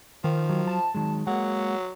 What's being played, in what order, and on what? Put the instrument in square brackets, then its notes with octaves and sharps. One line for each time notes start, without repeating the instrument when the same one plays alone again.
[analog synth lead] D#3 [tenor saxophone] F3
[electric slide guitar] F#3
[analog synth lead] A5
[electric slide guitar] D#3 F#3 G#3
[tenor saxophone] F#3 [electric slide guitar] G#3 A#3 [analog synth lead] F#5